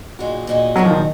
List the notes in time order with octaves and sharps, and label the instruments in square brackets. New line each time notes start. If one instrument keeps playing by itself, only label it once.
[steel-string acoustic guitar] A#2 G#3 D#4 F#4
A#2 G#3 D#4 F#4
[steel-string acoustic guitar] A#2 G#3 D#4 F#4 [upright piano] F#3
[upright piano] F3
D#3